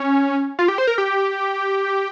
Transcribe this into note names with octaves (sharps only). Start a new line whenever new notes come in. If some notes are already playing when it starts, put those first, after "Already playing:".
Already playing: C#4
F4
G4
C5
A#4
G4